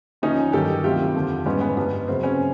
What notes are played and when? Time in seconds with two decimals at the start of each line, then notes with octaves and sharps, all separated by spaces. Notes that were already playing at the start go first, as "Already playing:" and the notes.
0.22 D#2 D3 F3 C#4 D#4
0.53 G2 D#3 F#3 G4 A4
0.84 D2 C3 D#3 F#3 F4 G4
1.16 F2 D3 F3
1.46 G#2 E3 G3 B3 C#4
1.61 B3
1.77 G2 E3 G3 B3
2.08 F#2 C#3 F#3 C4
2.23 B3 C#4